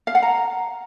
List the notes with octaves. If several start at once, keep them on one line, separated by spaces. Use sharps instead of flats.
F5
F#5
A#5